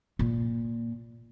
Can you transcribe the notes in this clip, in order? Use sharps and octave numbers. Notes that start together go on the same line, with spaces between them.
A#2